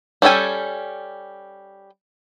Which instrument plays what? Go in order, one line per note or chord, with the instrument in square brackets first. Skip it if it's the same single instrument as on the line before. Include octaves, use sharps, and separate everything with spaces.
[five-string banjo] G3 C#4 A4 G5 G#5